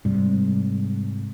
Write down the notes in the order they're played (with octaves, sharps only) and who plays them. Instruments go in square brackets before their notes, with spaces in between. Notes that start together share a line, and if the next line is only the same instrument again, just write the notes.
[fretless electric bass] G#2 C3 [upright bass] G3